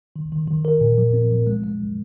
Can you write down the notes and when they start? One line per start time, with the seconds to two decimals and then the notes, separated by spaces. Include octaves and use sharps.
0.16 D#3
0.32 D#3
0.48 D#3
0.65 A#4
0.81 A#2
0.98 F3
1.13 C4
1.31 F3
1.47 G#3
1.64 G#3